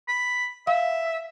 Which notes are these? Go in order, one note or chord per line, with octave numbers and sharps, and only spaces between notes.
B5
E5 F5